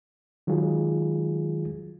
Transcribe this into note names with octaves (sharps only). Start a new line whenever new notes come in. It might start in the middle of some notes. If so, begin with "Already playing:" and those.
D#3 F#3 G#3 F4 G#4